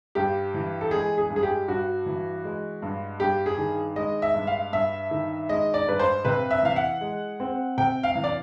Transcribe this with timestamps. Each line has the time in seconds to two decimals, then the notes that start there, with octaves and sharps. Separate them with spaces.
0.15 G2 G4
0.54 E3
0.81 A4
0.91 G#3 G#4
1.18 G#4
1.30 G2
1.36 G#4
1.43 G4
1.68 G2 F#4
2.06 E3
2.44 G#3
2.82 G2
3.20 G2 G4
3.46 G#4
3.58 D#3
3.96 G#3 D#5
4.22 E5
4.35 G2
4.47 F5
4.73 G2 E5
5.11 D#3
5.49 G#3 D#5
5.74 D5
5.87 G2 B4
5.99 C5
6.25 C3 B4
6.51 E5
6.63 E3 F5
6.76 F#5
7.01 G#3
7.40 C4
7.77 C3 G5
8.03 F5
8.15 E3
8.24 D5